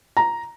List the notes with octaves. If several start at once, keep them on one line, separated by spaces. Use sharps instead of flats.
A#5